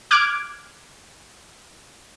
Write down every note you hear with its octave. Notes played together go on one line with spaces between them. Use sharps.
D6 F6 F#6 G#6 D7